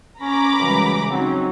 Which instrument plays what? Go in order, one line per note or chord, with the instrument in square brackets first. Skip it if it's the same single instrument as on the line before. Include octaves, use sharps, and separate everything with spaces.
[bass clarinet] C#4 [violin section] A#5 B5 D6
[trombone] F#2 [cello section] C#3 G3 G#3 [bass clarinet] E3
[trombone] F#3 [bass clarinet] C4 [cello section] C#4 D#4